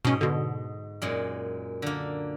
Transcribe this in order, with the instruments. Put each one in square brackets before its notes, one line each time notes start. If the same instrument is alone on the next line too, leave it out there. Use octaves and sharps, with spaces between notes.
[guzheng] G#2 D#5 [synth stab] B2 C#4
[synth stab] B2 D3
[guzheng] F#2 A#2 G#3
D3 A#3